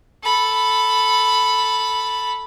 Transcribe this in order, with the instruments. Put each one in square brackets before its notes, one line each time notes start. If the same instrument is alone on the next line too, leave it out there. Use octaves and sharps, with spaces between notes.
[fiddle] A4 B5